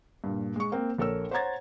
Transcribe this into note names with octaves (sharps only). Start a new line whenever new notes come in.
G2 A#2
G#3 C#6
A#3 C4
A#1 A4 A#4 C#5 E6
C5 C#5 F#5 A#5 G#6 A6